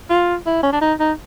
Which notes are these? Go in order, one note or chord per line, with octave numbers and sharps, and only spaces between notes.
F4
E4
C#4
D4
D#4
D#4